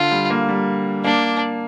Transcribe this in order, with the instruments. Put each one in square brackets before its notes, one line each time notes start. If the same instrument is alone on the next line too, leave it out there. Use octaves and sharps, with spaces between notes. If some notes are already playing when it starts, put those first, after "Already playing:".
Already playing: [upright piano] D3 [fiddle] F4
[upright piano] G3
A#3
G3
[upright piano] A#3 [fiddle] D4